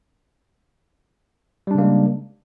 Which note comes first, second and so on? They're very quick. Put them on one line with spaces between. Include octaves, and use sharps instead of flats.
G3 D4 C#3 A#3 G#3